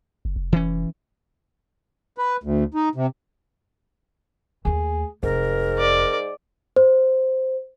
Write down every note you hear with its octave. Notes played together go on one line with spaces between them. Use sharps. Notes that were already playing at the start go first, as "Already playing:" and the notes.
F#1
F1
E3 C#4
B4
D2
D#4
C3
D#2 A3 G#4
F1 G#2 A#4
D5
C5